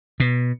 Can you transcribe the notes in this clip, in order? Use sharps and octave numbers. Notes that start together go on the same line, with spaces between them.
B2